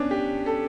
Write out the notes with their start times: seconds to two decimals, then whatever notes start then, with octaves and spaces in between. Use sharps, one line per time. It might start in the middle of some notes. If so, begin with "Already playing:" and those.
Already playing: B3 C#4 D4
0.11 G4
0.46 A4